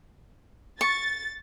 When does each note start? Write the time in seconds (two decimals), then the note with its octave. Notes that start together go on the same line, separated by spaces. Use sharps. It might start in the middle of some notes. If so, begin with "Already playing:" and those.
0.81 C#6 A6